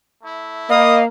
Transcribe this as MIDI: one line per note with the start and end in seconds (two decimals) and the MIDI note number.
0.22 0.68 57
0.22 0.68 64
0.70 1.06 58
0.70 1.02 75
0.70 1.05 77
0.70 0.97 83
0.70 0.97 87